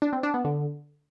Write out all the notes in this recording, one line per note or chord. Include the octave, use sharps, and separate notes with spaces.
D4
C4
D4
B3
D3